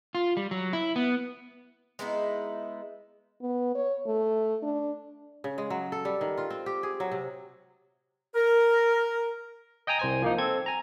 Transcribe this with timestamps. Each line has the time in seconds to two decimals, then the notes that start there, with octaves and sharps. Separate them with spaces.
0.15 F4
0.37 G3
0.51 F#3
0.73 E4
0.96 B3
1.99 G#3 B3 D#4 E4
3.41 B3
3.75 C#5
4.06 A3
4.63 D4
5.44 C#3
5.58 G#3
5.70 F#3
5.92 A4
6.05 G3
6.21 D#3
6.38 F4
6.50 C4
6.66 G4
6.83 G#4
7.00 F#3
7.12 C3
8.35 A#4
9.87 D#5 G5 G#5 A#5 D#6
9.99 C2 C5 G#5
10.22 F3 A#3 D#4
10.38 C4 A4 G#6
10.66 G#5 A#5